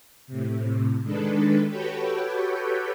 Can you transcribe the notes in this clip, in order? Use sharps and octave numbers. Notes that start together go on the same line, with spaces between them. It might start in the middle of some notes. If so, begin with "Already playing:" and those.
A2 C3
D#3 G#3 D4 A4 B4
F#4 G4 A4 B4 C#5 G5